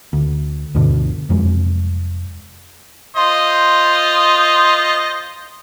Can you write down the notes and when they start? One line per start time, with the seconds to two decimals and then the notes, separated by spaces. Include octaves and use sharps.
0.13 D2
0.75 D2 G2 B2 D3
1.29 F1 F2 F#3 G#3
3.16 F4 C5 D#5